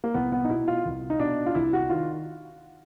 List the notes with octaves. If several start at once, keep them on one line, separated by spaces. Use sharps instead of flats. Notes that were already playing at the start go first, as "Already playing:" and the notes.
A#3
C2 B3
B3
D#4
B2 E4
F4
C2
D#4
B2 D4
F4
C2 E4
F#4
D#3 F4